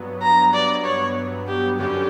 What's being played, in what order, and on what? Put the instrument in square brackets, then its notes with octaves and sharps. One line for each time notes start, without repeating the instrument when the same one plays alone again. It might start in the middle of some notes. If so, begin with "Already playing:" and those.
Already playing: [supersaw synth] G2 F#3 B3
[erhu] A#5
D5
C#5
G4
[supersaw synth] F#2 D3 G3 C#4 [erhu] G4